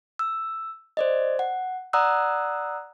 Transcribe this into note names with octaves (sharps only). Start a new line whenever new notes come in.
E6
C5 D5 D#5
F#5
D5 F#5 A#5 D#6 E6 F#6